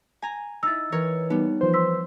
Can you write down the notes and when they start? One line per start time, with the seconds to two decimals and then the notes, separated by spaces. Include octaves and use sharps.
0.22 G#5 A#5
0.63 D#4 E4 E6 A6
0.92 E3 A#4 C#5
1.30 G3 B3 D#4
1.61 E3 F3 C5
1.74 C6 E6 B6